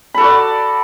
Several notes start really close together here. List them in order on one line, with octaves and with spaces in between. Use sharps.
B5 A4 F#4 D5